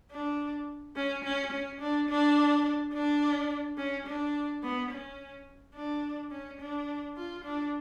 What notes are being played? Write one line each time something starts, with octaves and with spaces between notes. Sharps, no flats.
D4
C#4
C#4
C#4
D4
D4
D4
C#4
D4
B3
C#4
D4
C#4
D4
F4
D4